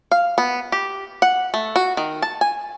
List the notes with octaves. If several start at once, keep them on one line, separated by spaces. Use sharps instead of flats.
F5
B3
G4
F#5
A3
F#4
D#3
A5
G#5